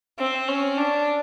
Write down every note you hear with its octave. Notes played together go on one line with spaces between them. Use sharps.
C4
C#4
D4